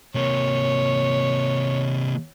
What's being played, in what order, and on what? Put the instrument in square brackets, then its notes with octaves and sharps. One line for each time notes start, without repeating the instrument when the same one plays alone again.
[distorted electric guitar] C3 A#3 [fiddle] C#5